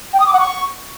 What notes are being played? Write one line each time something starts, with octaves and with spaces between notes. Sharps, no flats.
G5
D#6
D6
F#5
C#6